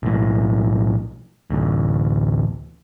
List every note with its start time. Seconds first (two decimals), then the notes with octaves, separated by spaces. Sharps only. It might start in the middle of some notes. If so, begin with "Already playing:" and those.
0.03 B1 A2
1.51 A1 D2